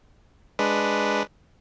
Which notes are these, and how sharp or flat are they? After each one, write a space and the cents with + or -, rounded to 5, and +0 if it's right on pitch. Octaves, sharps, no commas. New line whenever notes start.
G#3 +0 D4 +0 B4 +0